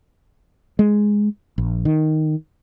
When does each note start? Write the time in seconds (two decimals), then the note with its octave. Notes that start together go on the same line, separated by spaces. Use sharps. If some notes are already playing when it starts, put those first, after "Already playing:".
0.79 G#3
1.58 A#1
1.85 D#3